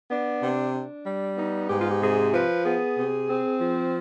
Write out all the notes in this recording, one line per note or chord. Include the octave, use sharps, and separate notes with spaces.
B3 D4
C3
D4
G3
B3 D#4
G#2 G4
F4
G4
C3 G#4
F3 B4
B3 G#4
C3
C4
F3